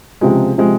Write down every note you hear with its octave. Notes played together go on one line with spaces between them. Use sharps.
C#2 C3 F3 G#3
C3 F3 G#3